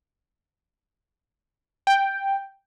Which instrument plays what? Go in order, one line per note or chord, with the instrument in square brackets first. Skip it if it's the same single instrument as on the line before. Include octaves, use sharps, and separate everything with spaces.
[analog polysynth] G5